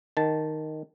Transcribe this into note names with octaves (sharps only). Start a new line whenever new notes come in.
D#3 A5